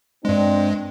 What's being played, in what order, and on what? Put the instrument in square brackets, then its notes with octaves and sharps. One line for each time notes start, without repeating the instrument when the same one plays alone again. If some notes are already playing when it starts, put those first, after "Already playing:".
[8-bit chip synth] G2 G#3 [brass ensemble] C4 D4